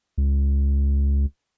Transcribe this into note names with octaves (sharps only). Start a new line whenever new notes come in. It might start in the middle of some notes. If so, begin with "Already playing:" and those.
C#2